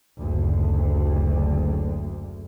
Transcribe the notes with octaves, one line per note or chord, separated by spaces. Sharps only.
F#1 D2